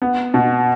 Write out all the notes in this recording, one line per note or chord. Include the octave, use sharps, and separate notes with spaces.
B3
B2